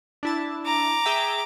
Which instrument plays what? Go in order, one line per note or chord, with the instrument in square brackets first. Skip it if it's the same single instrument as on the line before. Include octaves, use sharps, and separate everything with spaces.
[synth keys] D4 E4 A5
[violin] A#5 D6
[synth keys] G#4 E5 G5